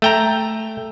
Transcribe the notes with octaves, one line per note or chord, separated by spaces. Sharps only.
A3 G5 A#5